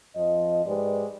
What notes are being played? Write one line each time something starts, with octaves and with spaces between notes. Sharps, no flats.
F2 F3 D#5
G#2 G#3 G4 B4 D5